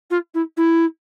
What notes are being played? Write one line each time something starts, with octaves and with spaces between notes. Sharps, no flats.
F4
E4
E4